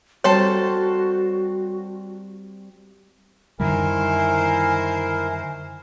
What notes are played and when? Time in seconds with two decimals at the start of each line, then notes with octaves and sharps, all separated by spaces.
0.24 G3 C4 F#4 A4 A#4 C5 C#5 A5
3.60 F#2 D3 D#3 G3 E4 A#4 C5 G#5